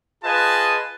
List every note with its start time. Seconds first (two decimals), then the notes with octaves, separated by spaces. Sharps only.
0.24 F4 G#4 B4 D#5 G#5 A5